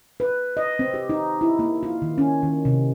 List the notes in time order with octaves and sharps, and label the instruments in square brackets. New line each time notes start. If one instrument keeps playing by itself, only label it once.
[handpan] B4
D#5
C4
G4
D#4
E4
A#3
F4
D#3
C#4
D#3
C3